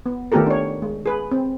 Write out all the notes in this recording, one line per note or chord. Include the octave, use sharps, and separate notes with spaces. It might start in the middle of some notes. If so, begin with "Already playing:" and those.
B3
D#3 A3 B3 G4 A4 A#4
D4 C#5
G#3
G#4 B4
C4